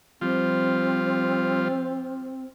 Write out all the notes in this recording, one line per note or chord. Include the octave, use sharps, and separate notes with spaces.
F3 G3 C4 F4